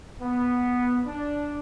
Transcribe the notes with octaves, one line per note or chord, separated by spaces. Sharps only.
B3
D4